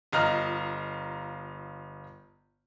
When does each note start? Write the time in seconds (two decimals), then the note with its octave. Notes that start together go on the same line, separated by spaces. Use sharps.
0.12 G1 F4 D#5 A#5 F6